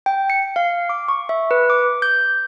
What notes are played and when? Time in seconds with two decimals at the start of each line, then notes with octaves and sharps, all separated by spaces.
0.06 G5
0.30 C#7
0.56 F5
0.89 D6
1.08 C#6
1.29 E5
1.51 B4
1.70 D6
2.02 G6